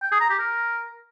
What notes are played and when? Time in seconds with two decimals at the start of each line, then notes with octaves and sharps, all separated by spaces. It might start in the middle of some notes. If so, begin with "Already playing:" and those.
0.02 G5
0.12 G#4
0.21 A#5
0.30 G4
0.39 A#4